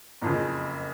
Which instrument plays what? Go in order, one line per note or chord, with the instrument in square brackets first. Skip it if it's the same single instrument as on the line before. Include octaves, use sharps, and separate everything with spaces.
[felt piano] F#1 F2 C#3